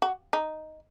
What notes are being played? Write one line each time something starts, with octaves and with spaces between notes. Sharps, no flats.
F#4
D#4